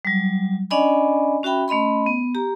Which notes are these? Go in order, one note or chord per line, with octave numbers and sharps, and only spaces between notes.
F#3 G3
C#4 D4 D5 D#5 G#5 B5
C#4 F#4 E5 G5 B5
A3 C#4 D#5 B5 C6
B3
G4 A#5